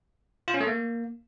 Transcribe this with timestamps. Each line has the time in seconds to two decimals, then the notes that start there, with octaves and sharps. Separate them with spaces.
0.48 F4
0.54 C#4
0.61 A3
0.67 A#3